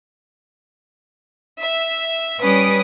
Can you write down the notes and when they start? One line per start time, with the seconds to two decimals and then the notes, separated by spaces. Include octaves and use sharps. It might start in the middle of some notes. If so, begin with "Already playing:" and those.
1.59 E5
2.41 G3 C#4 B4 D#6 D7